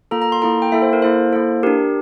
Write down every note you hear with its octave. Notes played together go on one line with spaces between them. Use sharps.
A#3 F4 A4 A#5
A#5
C6
A#3 E4 A4 A#5
G5
A#3 E4 A4 E5
C5
A#4
A#3 E4 A4 C5
A#3 E4 A4
D4 G4 A#4